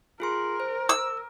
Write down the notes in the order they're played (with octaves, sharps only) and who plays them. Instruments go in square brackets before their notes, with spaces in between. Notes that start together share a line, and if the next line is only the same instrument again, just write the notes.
[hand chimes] F4 G#4 C6 [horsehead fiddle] A#4
[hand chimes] C5
[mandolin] E6